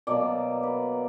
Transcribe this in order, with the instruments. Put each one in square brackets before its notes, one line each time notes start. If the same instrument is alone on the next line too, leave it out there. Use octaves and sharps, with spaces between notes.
[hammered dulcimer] B2 F#3 A#3 D5
B4